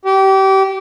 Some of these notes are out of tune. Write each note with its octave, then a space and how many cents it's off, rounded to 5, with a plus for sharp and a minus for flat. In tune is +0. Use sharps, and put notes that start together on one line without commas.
G4 -25